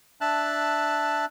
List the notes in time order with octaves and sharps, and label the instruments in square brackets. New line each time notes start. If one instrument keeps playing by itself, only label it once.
[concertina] D4 E5 A5 F#6